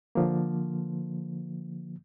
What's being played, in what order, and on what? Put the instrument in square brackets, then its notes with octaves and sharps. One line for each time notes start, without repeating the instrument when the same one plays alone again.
[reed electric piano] D3 F3 A#3